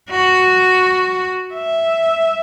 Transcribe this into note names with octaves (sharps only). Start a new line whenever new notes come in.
F#4
E5